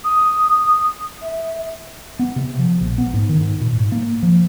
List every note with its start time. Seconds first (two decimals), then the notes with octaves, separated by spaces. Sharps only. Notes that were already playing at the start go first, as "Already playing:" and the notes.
0.04 D#6
1.21 E5
2.19 B3
2.36 C3
2.59 F3
2.81 A#1
2.98 B3
3.13 G#2
3.29 D#3
3.41 G#2
3.61 A#2
3.76 G#2
3.92 A#3
4.23 F3